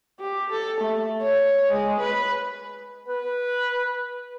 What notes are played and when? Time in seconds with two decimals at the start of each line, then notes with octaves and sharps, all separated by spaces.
0.20 G4
0.50 A4
0.81 A3
1.21 C#5
1.71 G#3
2.00 B4
3.08 B4